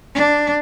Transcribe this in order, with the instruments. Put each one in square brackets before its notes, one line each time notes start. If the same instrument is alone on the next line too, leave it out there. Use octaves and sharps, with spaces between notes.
[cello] D4